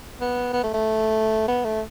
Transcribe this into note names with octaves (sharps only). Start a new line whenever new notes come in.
B3
B3
A3
A3
B3
A3